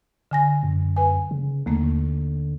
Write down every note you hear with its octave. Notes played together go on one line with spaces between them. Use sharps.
D3 G#5 A#6
F#2
B4 G#5
C#3
D#2 D3 A3 A#3